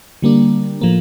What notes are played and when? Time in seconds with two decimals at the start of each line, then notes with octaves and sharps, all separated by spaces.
0.22 D3 G3 A#3 D4
0.81 A2 F3 A#3